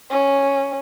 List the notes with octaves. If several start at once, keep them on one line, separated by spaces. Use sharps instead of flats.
C#4